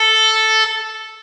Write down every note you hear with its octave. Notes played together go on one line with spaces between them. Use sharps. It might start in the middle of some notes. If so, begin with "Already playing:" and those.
Already playing: A4